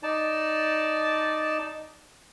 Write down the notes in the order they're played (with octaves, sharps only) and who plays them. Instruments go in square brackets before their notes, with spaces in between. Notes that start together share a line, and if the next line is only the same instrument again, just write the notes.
[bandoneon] D#4 D5 A5